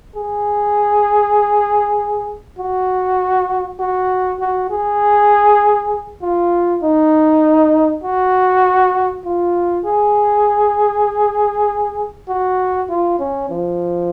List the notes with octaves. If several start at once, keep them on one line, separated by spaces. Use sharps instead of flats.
G#4
F#4
F#4
F#4
G#4
F4
D#4
F#4
F4
G#4
F#4
F4
C#4
F3